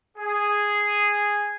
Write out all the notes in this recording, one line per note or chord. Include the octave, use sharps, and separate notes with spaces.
G#4